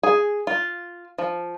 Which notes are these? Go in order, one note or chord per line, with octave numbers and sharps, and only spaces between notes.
G#4
F4
F3